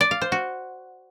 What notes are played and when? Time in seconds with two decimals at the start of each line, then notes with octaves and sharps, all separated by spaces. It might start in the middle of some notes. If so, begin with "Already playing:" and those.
0.01 D5
0.11 F5
0.22 C5
0.32 F#4